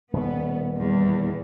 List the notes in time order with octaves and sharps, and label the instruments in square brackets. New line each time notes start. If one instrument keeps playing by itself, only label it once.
[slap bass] D#1 B2 [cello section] B3
[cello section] E2 G3